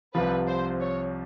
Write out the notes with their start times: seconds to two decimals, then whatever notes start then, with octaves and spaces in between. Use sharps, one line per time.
0.14 C2 C3 F3 B4
0.47 C5
0.81 C#5